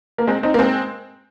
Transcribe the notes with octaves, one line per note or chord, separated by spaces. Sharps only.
A#3
G#3 C4
C4 D#4
A#3
G#3 C4